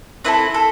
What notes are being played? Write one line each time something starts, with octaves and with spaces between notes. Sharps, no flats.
C4 E4 A4 B4
A4